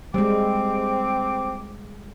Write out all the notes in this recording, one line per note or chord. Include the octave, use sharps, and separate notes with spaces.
G3 G#3 C4 D6